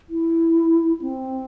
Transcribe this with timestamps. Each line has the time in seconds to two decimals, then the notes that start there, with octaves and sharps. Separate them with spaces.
0.09 E4
1.01 C4